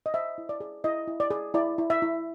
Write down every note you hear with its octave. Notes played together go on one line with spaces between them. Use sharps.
D#5
C5 E5
E4
D5
G#4
E4 D#5
E4
D5
G#4
E4 D5
E4
E5
E4